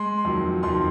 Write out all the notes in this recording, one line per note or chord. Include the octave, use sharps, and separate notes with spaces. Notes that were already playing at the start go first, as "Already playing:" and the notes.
Already playing: G#3 C6
F2 D#3 F#3
F2 D#3 F#3 C6